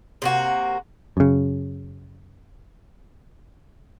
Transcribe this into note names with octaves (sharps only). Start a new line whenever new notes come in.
C3 A#3 F#4
F#2 C#3